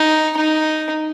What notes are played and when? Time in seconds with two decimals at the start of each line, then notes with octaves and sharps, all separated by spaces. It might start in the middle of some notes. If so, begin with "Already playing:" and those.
Already playing: D#4
0.37 D#4